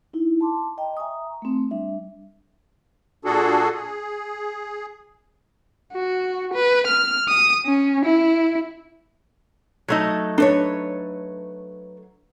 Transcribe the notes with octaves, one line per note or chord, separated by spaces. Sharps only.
D#4 E4
A5 C6 D6
D#5 G5 A#5
E5 G#5 A#5 C#6 D#6
A3 C4
G3 D4 E5
A#2 D4 F#4 G#4 A4
G#4
F#4
B4
F6
D#6
C#4
E4
F#3 A3 D#4
D4 A4 B4 C#5